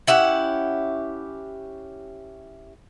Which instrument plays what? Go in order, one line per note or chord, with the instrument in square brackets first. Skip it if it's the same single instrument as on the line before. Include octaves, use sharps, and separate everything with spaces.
[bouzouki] C#4 E4 G4 F#5